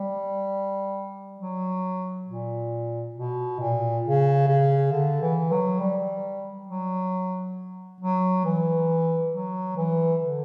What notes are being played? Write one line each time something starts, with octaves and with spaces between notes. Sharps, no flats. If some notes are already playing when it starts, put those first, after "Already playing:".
Already playing: G3
F#3
A#2
B2
A#2
C#3
C#3
D3
E3
F#3
G3
F#3
F#3
E3
F#3
E3
D3